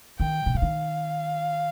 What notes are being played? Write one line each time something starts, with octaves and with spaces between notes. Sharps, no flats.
D#3 G5
C3
C#3
D#3 F5